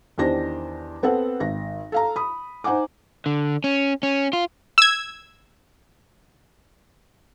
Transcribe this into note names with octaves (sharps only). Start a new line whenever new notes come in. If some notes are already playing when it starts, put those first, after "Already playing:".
E2 D#3 D4 G4 C5 A#6
B3 C4 A4 F#5
G#1 A#6
A4 F5 A#5
B5 D#6
D#4 C5 F#5 G#5 D6
D3
C#4
C#4
F4
E6 G#6